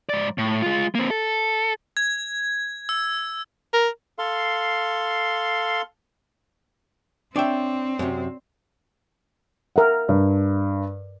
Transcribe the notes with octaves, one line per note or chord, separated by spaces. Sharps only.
G#2 D5
A2
G#3 F4
A#3 C4
A4
G#6
E6
A#4
A4 F5 C6
C4 D4 C#5 D5 E5 G5
F#2 C3
A#4 E5 F#5
G2